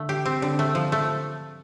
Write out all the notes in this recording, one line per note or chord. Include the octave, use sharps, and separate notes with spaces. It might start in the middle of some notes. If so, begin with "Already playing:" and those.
Already playing: D3 A3
G4
C4
D3
A3
F3
A3